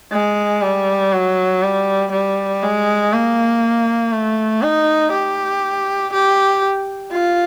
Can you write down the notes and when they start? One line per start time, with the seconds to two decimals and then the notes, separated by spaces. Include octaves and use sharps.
0.12 G#3
0.62 G3
1.13 F#3
1.63 G3
2.12 G3
2.63 G#3
3.13 A#3
4.13 A3
4.63 D#4
5.12 G4
6.13 G4
7.12 F4